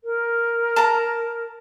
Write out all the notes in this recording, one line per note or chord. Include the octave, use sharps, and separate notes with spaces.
A#4
A5 A#5